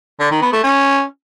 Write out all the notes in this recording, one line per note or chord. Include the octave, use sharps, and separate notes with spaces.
D3
D#3
B3
A3
C#4